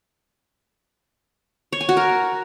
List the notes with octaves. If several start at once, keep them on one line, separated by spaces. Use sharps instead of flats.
C#5
G#5
F#4
A#4